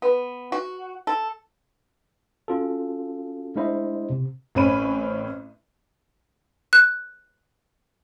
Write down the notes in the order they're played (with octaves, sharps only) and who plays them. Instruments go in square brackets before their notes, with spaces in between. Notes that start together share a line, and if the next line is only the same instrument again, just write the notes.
[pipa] B3
F#4
A4
[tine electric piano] C#4 F4 F#4 A4
G#3 D4 E4 C5 D#5 E5
C3
[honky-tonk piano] A1 C4 C#4 B5 D#7
[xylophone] F#6